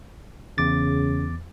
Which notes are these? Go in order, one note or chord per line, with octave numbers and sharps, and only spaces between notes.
E2 C#3 D6 A6